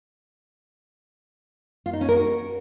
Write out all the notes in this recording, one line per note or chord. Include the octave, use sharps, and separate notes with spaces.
F4
D#4
C#4
A#4
F#4